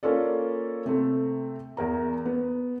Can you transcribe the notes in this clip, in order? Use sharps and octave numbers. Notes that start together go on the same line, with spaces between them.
A#3 C#4 F4 A4 D5
C3 A3 C4
E2 A#4 A#5
B3